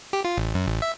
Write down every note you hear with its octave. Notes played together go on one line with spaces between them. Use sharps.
G4
F4
A1
F#2
A1
E5